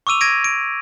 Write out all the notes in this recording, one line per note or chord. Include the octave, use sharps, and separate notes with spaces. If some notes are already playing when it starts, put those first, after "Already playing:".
C#6 D6 E6 D#7 F7
G#6 A#6 D7 D#7
D7